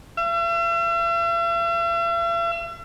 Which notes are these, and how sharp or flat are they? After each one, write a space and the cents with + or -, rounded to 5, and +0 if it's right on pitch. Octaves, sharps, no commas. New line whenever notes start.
E5 +45